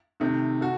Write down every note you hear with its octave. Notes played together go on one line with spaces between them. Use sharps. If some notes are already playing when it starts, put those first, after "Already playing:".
C3 D#3 A3
F#4 A4